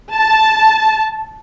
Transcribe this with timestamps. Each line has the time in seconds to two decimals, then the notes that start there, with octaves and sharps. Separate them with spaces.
0.13 A5